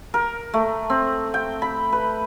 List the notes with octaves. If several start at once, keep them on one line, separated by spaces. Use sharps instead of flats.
A#4
A3
C4
G5
B5
B4